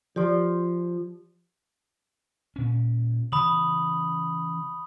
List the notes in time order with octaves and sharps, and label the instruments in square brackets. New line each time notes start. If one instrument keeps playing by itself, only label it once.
[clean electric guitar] F3 [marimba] G4 D5
[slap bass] A#2 C#4
[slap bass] C#3 E3 [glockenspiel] B5 D#6 F#7